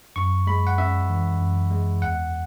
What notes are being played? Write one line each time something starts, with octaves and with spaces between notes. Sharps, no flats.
F#2 C#6
G#3 B5
F#5
C#4 E5
E3
F#2
G#3
E2 F#5